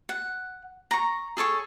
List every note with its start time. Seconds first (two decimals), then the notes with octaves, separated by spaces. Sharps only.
0.09 F#5
0.91 A#5 C#6
1.37 G#4 A4 C#5 C#6